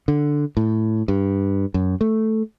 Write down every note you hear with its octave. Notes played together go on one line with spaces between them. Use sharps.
D3
A2
G2
F#2
A3